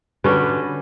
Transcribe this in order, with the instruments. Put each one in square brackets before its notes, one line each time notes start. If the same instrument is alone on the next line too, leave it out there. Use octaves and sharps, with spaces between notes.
[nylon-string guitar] D3 F#4 B4 [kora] G3 C#4